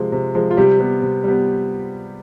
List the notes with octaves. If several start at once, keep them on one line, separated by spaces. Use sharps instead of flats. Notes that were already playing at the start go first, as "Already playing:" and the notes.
Already playing: C3 F3 G#3
C3
F3 G#3
F4
C3 G3 G4
G3 B3
C3
G3 B3